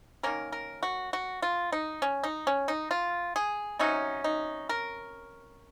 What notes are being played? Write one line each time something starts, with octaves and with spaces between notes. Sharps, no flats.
D#3 A#3 C#4 A#4
A#4
F#4
F#4
F4
D#4
C#4
D#4
C#4
D#4
F4
G#4
C3 F#3 C#4 D#4
D#4
A#4